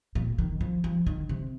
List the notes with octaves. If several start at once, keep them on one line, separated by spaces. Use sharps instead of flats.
A#2
D#3
F3
F3
D#3
C3